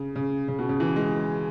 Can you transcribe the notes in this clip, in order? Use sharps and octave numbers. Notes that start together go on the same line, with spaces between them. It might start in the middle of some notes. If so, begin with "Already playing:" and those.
Already playing: C#3
C#3
C#3
B2
C#3
E3
G#3